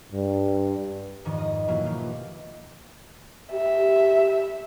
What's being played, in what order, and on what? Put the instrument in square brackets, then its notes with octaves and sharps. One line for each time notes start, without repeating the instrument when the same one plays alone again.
[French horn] G2
[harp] F2 G#2 D#3 F3
D#5
B2 E3 F#3 A#3 E4 F4
D#3 E3 F4 G4
[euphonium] G4 [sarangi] E5